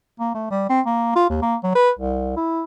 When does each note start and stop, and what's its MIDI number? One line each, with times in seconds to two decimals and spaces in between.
0.20 0.33 58
0.34 0.50 57
0.51 0.69 55
0.70 0.81 60
0.86 1.13 58
1.16 1.28 65
1.29 1.39 39
1.42 1.56 58
1.64 1.75 54
1.75 1.91 71
1.99 2.32 36
2.37 2.63 64